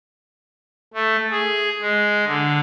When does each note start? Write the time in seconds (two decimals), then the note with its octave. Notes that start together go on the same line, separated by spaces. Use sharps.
0.94 A3
1.31 G#4
1.81 G#3
2.26 D3